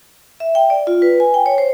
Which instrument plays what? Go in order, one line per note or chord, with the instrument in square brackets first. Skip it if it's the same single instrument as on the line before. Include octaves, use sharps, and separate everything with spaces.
[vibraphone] E5
G5
D5
F4
B4
G#5
G5
C#5
C5